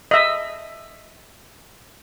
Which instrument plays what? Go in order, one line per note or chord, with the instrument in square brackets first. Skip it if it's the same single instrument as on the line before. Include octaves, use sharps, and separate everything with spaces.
[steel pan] D#5 E5